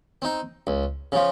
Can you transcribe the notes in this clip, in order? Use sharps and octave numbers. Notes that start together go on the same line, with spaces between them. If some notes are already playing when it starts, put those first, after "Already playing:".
C4 D#4
C#2
C#3 F3